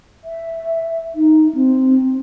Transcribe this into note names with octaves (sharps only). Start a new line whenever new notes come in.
E5
D#4
C4